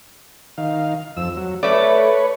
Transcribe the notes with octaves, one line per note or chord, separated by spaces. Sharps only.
D#3 F5
F2 E6
F#3
A3 B4 C#5 D5